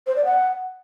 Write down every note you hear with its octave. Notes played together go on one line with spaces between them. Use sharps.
C5
D5
F#5